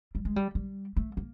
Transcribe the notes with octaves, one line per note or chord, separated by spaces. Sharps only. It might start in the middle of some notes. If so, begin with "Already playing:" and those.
G3
G#3
G3
G3
A3
A#3